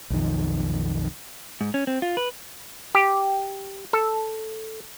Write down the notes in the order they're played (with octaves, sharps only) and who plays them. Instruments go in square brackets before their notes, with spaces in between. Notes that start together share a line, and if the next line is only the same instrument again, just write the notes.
[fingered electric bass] B1 F2 D#3
[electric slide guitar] G#2
C#4
C4
F4
B4
[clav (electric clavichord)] G4
A4